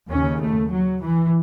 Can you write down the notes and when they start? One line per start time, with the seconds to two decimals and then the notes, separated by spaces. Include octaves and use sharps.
0.11 D#2 C#3 C#4
0.41 A3
0.72 F#3
1.01 E3